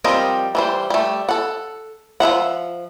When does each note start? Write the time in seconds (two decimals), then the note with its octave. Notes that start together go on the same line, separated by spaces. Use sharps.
0.04 F3 G3 C4 A#4 D#5
0.55 E3 G3 C5
0.90 G3 A3
1.29 A4 F#5
2.20 F3 D#4 E5 F#5